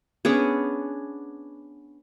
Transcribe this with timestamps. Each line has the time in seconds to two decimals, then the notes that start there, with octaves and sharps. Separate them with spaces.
0.25 B3 C#4 D4 G#4